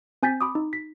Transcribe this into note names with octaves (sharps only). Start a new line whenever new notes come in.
C4 G#5 G6 A6 B6
B5 D6 D#6
D#4
B6